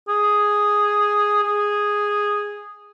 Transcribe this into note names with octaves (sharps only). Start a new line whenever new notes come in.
G#4
G#4